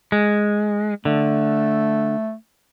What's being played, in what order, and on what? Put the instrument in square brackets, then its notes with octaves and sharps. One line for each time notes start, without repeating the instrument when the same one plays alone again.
[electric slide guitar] G#3
[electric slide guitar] D3 [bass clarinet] A3